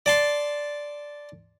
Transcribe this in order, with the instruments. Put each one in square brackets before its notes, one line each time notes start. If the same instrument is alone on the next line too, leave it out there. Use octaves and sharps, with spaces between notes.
[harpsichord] D5 A5 C6